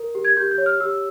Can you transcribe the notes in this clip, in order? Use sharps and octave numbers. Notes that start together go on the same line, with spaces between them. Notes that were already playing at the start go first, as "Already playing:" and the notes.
Already playing: A#4
G4
G#6
G4 G6
G6
C#5
F6
G4 E6